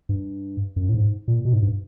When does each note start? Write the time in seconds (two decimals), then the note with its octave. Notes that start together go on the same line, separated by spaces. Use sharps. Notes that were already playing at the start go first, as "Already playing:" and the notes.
0.09 G2
0.76 F#2
0.89 A2
0.94 G#2
1.28 A#2
1.45 B2
1.53 G#2
1.62 G2